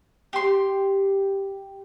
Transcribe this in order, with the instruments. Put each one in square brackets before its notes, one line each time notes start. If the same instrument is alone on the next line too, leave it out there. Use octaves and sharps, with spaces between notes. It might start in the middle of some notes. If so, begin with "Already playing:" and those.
[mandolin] G4 C6